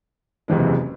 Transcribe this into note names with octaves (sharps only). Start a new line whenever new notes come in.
F#1 E2 C3 E3 G#3